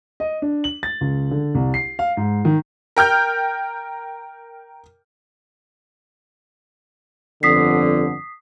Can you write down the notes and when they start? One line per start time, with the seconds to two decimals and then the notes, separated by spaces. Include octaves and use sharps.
0.20 D#5
0.42 D4
0.64 F#7
0.83 A6
1.01 C#2
1.31 D3
1.55 C2
1.74 C7
1.99 F5
2.17 G#2
2.45 D#3
2.97 A#4 G5 F6 G6
7.43 G1 F2 D3 D#6 B6 C7